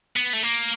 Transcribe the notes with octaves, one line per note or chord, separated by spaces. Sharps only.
B3
A3
A#3